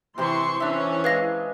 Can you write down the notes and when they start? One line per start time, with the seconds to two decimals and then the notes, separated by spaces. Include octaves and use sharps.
0.18 C3 E3 E4 G4 A#5 C6 C#6
0.60 E3 C#4 D4 C#5 E5
1.04 G#3 G#4 B4 F5 A#6